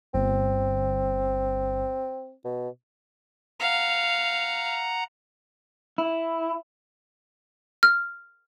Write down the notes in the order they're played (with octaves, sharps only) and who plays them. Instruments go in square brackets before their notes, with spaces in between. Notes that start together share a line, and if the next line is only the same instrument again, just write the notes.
[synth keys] G1 [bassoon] C4
[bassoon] B2
[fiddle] F5 [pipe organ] F#5 A#5
[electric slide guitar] E4
[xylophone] F6